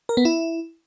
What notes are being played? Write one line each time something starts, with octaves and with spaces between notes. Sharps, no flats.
A#4
B3
E4